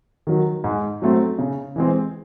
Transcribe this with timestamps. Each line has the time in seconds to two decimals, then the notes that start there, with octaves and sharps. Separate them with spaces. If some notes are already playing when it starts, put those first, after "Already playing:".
0.27 D#3 F#3
0.64 G#2
1.02 F#3 A3 C4
1.39 C#3
1.76 E3 G#3 C4